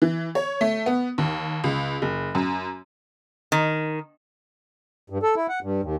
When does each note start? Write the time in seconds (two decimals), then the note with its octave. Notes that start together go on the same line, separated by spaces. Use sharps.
0.02 E3
0.35 C#5
0.61 A3
0.86 B3
1.18 D#2
1.64 C#2
2.02 F#1
2.35 F#2
3.52 D#3
5.10 G2
5.22 A4
5.36 E4
5.49 F#5
5.63 G2
5.83 D#2